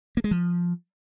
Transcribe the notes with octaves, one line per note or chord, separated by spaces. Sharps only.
A#3
G#3
F3